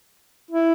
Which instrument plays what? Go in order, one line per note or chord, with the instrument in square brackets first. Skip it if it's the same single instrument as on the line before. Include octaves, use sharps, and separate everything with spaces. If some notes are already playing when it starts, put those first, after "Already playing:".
[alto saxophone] E4